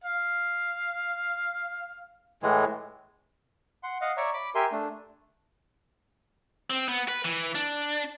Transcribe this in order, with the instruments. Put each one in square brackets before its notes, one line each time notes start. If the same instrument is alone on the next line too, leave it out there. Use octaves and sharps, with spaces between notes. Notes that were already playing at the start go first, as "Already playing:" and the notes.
[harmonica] F5
[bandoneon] A2 E3 G#3
[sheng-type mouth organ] F#5 C6
D#5 F5 F#5
C#5 D5 E5 A#5 C#6
B5 D6
G4 A#4 E5 G#5 C6
A3 D4
[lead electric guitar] C4
B3
B4
E3
D4